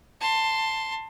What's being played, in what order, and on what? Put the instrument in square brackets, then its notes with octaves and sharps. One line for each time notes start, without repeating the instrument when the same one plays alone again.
[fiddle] A5 C6